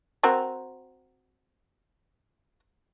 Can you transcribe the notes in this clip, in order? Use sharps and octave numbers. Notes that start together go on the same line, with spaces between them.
C4 F#4 A#4